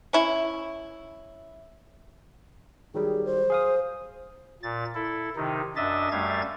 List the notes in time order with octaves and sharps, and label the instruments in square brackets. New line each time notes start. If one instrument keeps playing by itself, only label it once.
[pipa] C#4 E4
[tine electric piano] D#3 F#3 G3 [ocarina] G#4
[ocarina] C5
[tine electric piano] G#4 F5 D#6
[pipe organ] A#2 A6
E4 A4
C3 D#3 D#4
F#2 D4 D#5 E5 A6
F#2 G3 A3 F5 G#6 A6